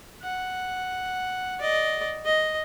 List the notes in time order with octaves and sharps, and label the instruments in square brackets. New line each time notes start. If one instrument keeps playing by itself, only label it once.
[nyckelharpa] F#5
D5 D#5
D#5